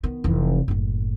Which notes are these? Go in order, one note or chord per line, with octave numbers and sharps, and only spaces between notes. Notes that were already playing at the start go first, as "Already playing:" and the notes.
D#3 B3
F1 E3
F#1 A2